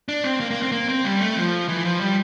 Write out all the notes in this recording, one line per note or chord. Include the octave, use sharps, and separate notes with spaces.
D4
C4
A#3
A#3
C4
A#3
C4
G3
A3
F3
E3
F3
G3